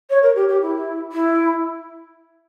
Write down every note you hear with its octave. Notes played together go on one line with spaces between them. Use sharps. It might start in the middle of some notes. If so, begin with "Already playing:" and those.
C#5
A#4
G4
G4
E4
E4